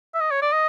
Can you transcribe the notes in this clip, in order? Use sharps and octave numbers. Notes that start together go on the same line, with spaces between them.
E5
D#5
C#5
D5
D#5